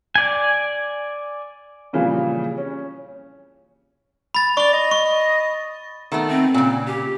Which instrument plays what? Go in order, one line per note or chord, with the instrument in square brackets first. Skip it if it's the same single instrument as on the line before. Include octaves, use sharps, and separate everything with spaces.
[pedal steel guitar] D5 G#5
[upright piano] A#2 C#3 E3 F3 G3
C#4
[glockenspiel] B5 A6
[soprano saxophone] D5 [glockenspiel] C#6 G7
[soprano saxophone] D#5
[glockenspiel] C#6
[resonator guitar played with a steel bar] D#3 A3 B3
[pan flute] C4
[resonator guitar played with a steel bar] A#2 C#3
[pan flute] G4